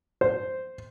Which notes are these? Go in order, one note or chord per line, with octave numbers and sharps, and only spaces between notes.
C5